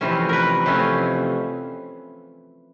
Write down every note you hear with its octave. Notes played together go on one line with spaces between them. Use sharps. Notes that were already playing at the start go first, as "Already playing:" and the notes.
F2 C3 E3 A3 C#4
A#4 B4
F2 C3 E3 A3 C#4